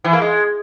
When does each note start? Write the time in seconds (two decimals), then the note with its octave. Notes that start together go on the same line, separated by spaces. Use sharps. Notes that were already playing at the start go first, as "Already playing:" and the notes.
0.04 E3
0.13 A#3
0.21 G#3